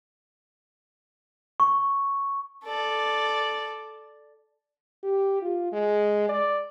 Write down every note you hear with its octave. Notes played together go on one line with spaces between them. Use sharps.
C#6
A4 D5
G4
F4
G#3
D5